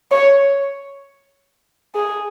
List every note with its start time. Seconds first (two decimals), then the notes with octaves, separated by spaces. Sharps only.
0.11 C#5
1.95 G#4